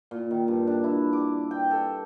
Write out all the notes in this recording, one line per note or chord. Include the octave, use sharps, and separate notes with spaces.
A#2
D#3
G2
D4
E4
D6
G5
A4